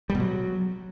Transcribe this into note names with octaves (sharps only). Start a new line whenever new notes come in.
G3
B2
F#3